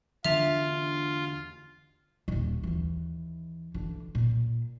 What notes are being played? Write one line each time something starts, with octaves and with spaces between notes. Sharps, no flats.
E2 D3 D4 F4 E5 F7
D#1 D#2
D#2 E3
D3 E3
A#2